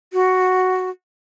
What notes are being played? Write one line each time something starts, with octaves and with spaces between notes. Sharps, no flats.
F#4